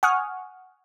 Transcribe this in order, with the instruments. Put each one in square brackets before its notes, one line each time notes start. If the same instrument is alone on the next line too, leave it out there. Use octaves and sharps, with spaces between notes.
[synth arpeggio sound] F#5 G#5 C#6 D#6 F6